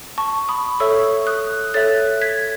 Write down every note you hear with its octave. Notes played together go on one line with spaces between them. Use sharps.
A5 C#6
B5 D#6
A4 C#5 E5 C#6 E6
D#6 F#6
A4 C#5 E5 F#6 A6
G#6 B6